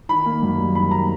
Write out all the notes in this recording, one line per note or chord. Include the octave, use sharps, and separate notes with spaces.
D#3 B5
A#3
F#2
G3
D#3 B5
A#3 A#5